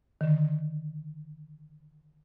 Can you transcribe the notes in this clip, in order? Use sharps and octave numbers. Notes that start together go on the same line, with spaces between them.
D3 D#3